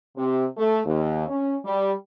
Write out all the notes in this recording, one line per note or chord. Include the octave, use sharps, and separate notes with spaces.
C3
A3
D#2
C#4
G3